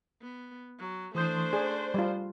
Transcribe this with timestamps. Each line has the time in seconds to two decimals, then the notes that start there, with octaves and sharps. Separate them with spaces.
0.21 B3
0.80 F#3
1.15 E3 A3 D4 C5 D#6 G6
1.53 G#4 D5
1.94 G3 F4